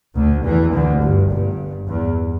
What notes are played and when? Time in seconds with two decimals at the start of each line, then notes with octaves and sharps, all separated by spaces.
0.15 D2 D3
0.44 E2 E3
0.73 D2 D3
1.02 G1 G2
1.30 G1 G2
1.88 E2